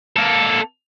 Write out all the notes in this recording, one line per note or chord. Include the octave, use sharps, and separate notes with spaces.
A#3 A4